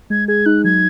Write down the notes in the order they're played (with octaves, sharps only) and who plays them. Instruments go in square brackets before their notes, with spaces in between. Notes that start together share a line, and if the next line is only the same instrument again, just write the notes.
[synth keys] G#3 [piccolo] G#6
[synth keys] G#4 [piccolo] G#6
[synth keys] D#4 [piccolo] F#6
[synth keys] F#3 [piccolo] G#6